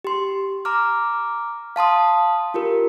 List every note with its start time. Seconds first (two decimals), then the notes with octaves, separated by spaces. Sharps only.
0.04 G4 C6
0.65 A#5 D6 F6
1.76 F5 A5 C6 D#6
2.54 F4 G4 A#4